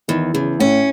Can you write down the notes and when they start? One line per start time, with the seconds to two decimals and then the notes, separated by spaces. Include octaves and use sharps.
0.08 E2 D#3
0.34 E2 C#3
0.59 A2 C#4